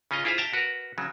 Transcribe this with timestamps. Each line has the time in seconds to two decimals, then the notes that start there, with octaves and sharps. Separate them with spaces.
0.11 C#3 C#4 F4 D#5 A#5
0.25 E4 F4 G#4 C5 E5 F5
0.38 E5 F5 G5 A5 A#5
0.53 F#4 A#4 B4
0.98 C#3 F#3